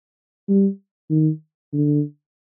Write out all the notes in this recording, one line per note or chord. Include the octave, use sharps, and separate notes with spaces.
G3
D#3
D3